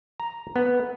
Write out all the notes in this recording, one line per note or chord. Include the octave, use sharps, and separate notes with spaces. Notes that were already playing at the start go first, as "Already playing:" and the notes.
A#5
B3